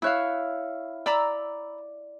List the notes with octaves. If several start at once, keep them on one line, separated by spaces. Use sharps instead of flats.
E4 C#5 F5 E6 F#6
D5 A#5 B5 E6